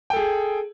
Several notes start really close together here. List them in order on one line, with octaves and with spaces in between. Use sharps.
G5 A4 G#4